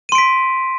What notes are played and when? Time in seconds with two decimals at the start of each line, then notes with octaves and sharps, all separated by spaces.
0.09 D#7
0.12 C6
0.15 D7
0.18 B6